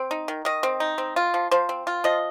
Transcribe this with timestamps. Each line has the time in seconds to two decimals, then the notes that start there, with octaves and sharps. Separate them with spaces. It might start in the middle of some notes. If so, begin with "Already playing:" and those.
Already playing: C4
0.11 D#4
0.28 D#3
0.45 D#3 D#5
0.63 C4
0.80 D#4
0.98 C4
1.16 F4
1.34 F3
1.51 F3 C5
1.69 C4
1.87 F4
2.04 F3 D#5